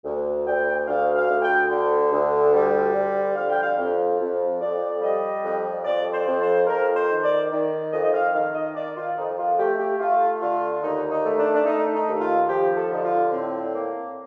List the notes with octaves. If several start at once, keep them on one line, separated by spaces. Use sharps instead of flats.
D2
D2 G5
D2 F5
F5
D2
G5
D3
D2
G3
D3
F2 F5
G5
F5
F2
F2
F2 D5
G3 D#5
F2
F2 D5
C5
F2
C5
F2 A#4
C5
D#3
D5
D#3
F2 D#5
D#5
F5
D#3 F5
D#5
D#3 D5
F4
F2 D#4
F4
A3 G4
G4
A3 F4
D3 F4
D#2 D#4
D#4
A3
D4
D4
A3 D#4
D#4
D#2
F4
F3 G4
A4
D3 D#4
F4
A2 C4
A#3